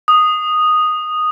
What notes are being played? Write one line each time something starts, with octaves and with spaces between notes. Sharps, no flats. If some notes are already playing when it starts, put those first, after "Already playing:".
D#6